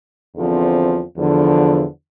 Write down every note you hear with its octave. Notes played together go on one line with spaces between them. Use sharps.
E2 D3 F3 C4
E2 D3 F3